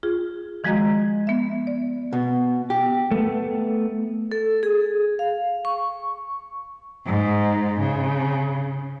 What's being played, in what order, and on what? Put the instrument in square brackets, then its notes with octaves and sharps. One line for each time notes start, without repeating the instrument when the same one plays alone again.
[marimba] F4 G#4
D#3 F3 G#3 F#4 D#5 A#5
B3 E5
D5
[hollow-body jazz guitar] B2
G4
[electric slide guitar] A3 B3
[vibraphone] A4
G#4
F5
C#6
[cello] G#2
C#3